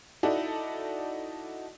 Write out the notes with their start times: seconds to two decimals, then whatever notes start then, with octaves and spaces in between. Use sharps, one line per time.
0.23 D#4 E4 F#4 A4 D5